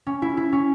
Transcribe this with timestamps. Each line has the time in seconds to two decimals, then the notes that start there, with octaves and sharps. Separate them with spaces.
0.06 C#4
0.22 E4
0.37 E4
0.52 C#4